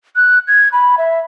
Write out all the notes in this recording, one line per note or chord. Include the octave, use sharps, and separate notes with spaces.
F#6
G#6
B5
E5